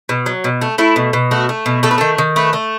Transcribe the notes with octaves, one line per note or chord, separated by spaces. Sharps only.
B2
F#3
B2
A3
A3 E4
B2
B2
A3 F#4
A3
B2
A3 A4
B4
D#3 A4
D#3
A3 B4
A3